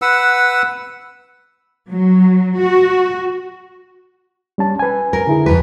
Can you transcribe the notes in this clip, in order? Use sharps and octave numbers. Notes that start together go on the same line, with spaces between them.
B4 F#5 E6
F#3
F#4
G3 C#4 A5
B4 G#5
A#4
D3 E4 G#4
F2 B4